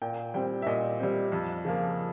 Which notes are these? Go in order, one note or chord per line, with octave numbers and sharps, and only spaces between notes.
A#2 G5
G3 C4 G5
E5
A#2 D#5
G3 C4
F2
C#3 F3 A#3